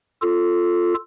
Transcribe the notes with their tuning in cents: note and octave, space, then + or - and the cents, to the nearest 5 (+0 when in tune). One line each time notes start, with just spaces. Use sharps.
F4 +0 A4 +0